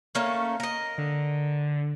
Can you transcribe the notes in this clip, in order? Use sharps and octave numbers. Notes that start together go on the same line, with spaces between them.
A3 A#3 C#4
A#4 D#5
D3